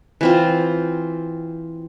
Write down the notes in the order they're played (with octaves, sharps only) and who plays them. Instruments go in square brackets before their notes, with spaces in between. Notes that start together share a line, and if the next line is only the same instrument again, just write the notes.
[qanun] E3 C4 F4